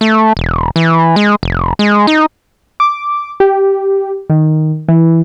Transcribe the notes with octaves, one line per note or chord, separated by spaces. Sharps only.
A3
E1
E3
G#3
F1
G#3
D#4
D6
G4
D#3
E3